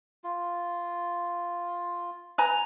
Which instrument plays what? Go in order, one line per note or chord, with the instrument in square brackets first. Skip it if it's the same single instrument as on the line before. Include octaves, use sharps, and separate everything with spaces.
[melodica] F4
[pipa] B4 G#5 A#5